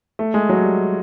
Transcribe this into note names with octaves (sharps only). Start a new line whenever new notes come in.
A3
G#3
F#3
G3